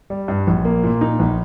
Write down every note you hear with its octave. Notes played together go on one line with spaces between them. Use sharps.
G3
G2
A#1
A#3
A#2
D#4
A#1